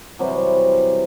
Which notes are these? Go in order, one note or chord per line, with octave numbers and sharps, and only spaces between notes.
C3 E3 F#3 G3